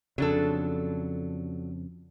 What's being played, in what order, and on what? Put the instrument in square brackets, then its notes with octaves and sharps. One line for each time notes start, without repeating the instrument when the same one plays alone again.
[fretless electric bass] F2 C#3 [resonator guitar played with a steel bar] F#3 D4 A4